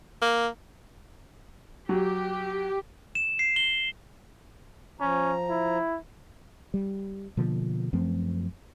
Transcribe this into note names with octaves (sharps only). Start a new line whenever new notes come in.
A#3
F#3 G4
E7
C7
G7
F3 C#4 A#5
E4
G3
B2 D3 F3 A#3
F#2 F3 A3 C4